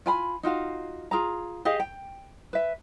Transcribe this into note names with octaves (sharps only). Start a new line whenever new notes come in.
F4 G#5 B5
D#4 F4 F#4 F5
F4 G#4 A#5
G4 G#4 D#5 F5
G5
B4 E5